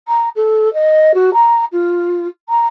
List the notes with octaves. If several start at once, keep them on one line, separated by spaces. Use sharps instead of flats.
A#5
A4
D#5
F#4
A#5
F4
A#5